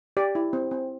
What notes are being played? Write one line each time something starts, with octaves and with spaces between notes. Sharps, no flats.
G4 D5
E4
C4
C4